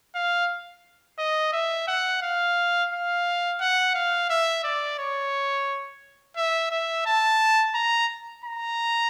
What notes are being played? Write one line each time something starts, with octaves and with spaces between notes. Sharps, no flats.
F5
D#5
E5
F#5
F5
F5
F#5
F5
E5
D5
C#5
E5
E5
A5
A#5
A#5